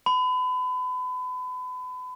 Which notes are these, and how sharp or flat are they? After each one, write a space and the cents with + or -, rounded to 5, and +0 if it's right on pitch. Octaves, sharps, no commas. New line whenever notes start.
B5 +35